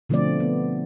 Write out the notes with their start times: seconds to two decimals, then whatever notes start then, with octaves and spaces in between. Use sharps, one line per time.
0.09 B2 D3 F3 A3 C4 D5
0.40 B3